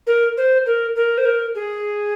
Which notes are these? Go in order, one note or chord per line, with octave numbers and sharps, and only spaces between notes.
A#4
C5
A#4
A#4
C5
A#4
G#4